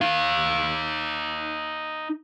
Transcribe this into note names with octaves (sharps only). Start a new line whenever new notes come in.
D#4 F5